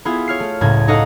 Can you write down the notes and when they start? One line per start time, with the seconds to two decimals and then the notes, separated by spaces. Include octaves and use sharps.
0.05 B3 E4 F4 G#4
0.27 C#5 F6 C7
0.40 A3
0.61 F#1 C#2 A2 G#6
0.88 D#4 A4 C#5 D#5 F5 F#5